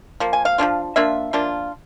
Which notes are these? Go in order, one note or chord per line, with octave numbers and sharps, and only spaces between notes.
F3 A#3
G#5
F5
F3 A#3 D4 F4
F3 A#3 D4 F4 E5
F3 A#3 D4 F4